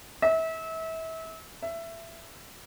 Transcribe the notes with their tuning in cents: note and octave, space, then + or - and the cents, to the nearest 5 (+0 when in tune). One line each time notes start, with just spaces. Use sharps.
E5 -30
E5 +15